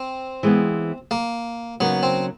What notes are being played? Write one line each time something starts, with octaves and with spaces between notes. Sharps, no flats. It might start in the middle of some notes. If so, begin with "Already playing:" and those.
Already playing: C4
E3 G#3 B3
A#3
C#3 F#3 A#3 B3 D#4
C4